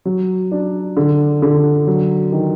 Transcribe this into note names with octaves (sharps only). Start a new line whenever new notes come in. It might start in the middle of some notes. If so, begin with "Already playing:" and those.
F#3
D4
D3
D3
F#3
D#3